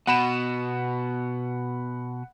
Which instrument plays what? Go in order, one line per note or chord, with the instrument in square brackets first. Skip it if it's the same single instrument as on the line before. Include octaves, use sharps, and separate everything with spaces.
[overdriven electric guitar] B2 [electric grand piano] F#5 B5 E7